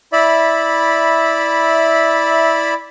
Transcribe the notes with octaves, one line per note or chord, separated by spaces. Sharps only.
E4 D5 E5 B5